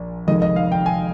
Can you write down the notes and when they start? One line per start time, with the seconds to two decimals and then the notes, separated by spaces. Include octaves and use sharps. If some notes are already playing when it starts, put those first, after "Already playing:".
Already playing: A#1 A#2
0.27 F1 F2 D#3 G#3 D#5
0.42 D#5
0.56 F5
0.72 G5
0.86 G#5